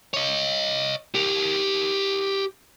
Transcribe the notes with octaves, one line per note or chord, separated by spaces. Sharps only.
C#5 D#5
G4 A#4